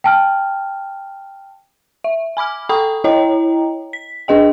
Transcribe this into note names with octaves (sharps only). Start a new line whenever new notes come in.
G5 A5 F6
E5
G#5 B5 D6 F6
A4 G5 A#5 B5 C#6 D#6
E4 C#5 D#5 G5 A#5
B6
D4 G#4 D#5 G5